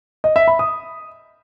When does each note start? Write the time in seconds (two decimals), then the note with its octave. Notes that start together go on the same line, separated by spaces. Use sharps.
0.24 D#5
0.36 E5
0.48 B5
0.59 D#6